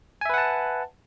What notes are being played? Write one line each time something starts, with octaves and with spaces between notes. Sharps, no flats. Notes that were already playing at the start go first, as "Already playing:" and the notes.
B4 E5 F#5 G#5 A5